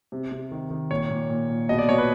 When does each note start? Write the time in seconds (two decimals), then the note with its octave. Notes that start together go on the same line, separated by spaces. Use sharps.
0.12 C3
0.31 C3
0.51 D#3
0.71 D#3
0.91 A#2 C#5
1.10 A#2
1.30 A#2
1.50 A#2
1.69 B2 D#5
1.78 D5
1.89 B2 C#5
1.98 B4